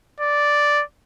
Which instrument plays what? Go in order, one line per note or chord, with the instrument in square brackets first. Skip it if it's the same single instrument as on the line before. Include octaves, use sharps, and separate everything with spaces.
[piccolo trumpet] D5